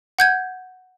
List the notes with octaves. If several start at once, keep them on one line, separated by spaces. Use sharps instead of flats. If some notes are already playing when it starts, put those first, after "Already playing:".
F#5 G6 G#6